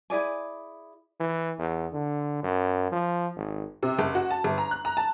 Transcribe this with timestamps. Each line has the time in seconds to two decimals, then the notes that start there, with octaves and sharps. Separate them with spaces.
0.10 E4 G#4 D5 G#5
1.20 E3
1.59 E2
1.93 D3
2.43 F#2
2.92 F3
3.36 G#1
3.83 C3
3.99 F#1
4.15 F#4
4.30 A5
4.44 G1
4.58 A#5
4.71 F#6
4.85 A#5
4.97 A5